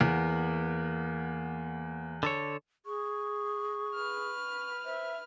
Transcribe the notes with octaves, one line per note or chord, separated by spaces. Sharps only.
E2 A#3 B3
D3 A4 C#5
G#4 C#6
B4 F6
C5 E5